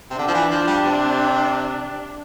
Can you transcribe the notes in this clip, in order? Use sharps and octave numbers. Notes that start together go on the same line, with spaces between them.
C3
D3 D4
F3
E3
F3
G3
C3